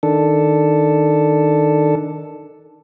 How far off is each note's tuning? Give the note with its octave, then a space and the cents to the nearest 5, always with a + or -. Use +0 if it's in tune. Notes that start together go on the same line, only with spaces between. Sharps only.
D#3 +0 D4 +0 A4 +0